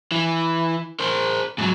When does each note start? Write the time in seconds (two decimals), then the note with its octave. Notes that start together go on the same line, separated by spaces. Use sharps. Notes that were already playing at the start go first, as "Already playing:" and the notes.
0.11 E3
1.00 A#4 C5
1.58 G#2 F#3